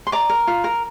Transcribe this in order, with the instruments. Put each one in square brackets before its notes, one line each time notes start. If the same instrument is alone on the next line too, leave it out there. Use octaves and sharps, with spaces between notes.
[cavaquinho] C6
D5 A#5 D6
A#4
F4
A#4